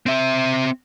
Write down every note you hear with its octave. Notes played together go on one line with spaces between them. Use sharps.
C4 E5